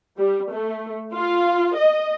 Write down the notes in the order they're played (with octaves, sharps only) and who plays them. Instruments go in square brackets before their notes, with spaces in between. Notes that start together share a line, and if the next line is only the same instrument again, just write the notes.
[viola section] G3
A3
F4
D#5